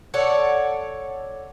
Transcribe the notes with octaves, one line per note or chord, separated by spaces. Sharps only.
A4 C#5 D5 F#5